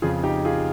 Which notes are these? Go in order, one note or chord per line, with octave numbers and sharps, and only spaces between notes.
F2 C#3 F4 G#4
D#4 G4
F4 G#4